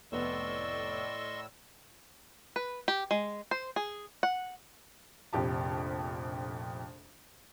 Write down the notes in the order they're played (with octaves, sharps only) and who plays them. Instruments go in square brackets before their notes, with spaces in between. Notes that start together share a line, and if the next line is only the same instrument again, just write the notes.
[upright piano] F1 B3 [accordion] A2 E6 [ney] D5 [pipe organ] D#5 C6 C#6
[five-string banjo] B4
G4
G#3
C5
G#4
F#5
[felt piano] F1 A#1 F2 G4 A5